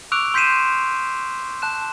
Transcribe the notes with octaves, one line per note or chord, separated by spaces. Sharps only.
C#6 D6 E6 F#6 D7 F7
C6 G6 B6 C7 D#7 E7
A5 F#6 E7